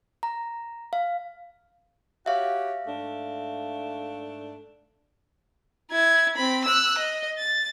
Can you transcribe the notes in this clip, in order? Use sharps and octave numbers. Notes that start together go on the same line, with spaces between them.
A#5
F5
F#4 G4 C#5 E5 F5
G#2 A3 D4
E4 G#6
C4 B5
E6 F#6
D#5
A6